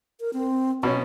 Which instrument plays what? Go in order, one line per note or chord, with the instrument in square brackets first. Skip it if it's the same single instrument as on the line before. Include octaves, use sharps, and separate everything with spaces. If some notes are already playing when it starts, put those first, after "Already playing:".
[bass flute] A#4
C4
[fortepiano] B2 C#4 [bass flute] C#5